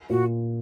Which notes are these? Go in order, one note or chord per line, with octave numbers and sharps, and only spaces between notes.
A#2 F#4